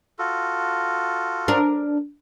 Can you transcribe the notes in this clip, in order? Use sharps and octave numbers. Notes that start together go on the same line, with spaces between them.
F4 F#4 A4
D4 A#4